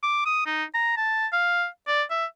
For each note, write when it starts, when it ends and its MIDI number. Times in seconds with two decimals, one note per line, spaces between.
0.03 0.23 86
0.26 0.46 87
0.46 0.64 63
0.74 0.94 82
0.97 1.27 81
1.33 1.66 77
1.88 2.03 74
2.10 2.25 76